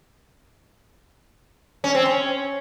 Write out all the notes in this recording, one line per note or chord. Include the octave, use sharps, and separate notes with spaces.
C#4
C4
C#4